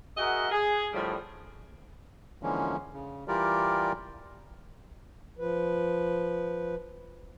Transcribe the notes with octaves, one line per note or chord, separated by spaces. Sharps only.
F#4 G#4 A#4 D#5 E5 F#5
G#4
A2 D3 F3 G3
D3 E3 F3 G#3 A#3 C#4
C#3
E3 G3 F4 G4 A#4 D5
F3 B4